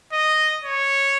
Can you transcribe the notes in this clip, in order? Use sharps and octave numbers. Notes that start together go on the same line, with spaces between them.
D#5
C#5